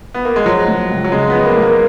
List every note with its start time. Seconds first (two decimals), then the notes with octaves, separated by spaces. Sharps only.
0.14 B3
0.25 A#3
0.36 G#3
0.45 F3 F#3
0.68 G#3
0.90 C#2
1.04 F#3
1.12 C#3 G#3
1.30 B3
1.35 F3
1.45 A#3
1.57 G#3 A#3